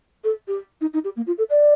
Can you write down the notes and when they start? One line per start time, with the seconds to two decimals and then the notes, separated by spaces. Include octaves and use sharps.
0.24 A4
0.47 G4
0.81 D#4
0.93 D#4
1.04 G4
1.16 A#3
1.27 F4
1.38 A4
1.50 D5